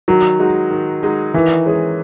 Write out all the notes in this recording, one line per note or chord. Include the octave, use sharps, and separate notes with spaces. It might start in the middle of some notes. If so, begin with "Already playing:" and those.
D#3 F#3
G#3 D#4 F#4
D#3
G#3 D#4 F#4
D#3 E3
G#3 C#4 G#4